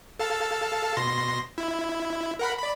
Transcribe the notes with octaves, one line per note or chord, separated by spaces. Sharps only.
A4 F5 A5
B2 C6 A#6
E4
A#4 F#5 B5
D5 B5